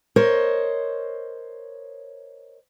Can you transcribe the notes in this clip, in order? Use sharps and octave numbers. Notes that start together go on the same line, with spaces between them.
A#4 C5 C#5 D#5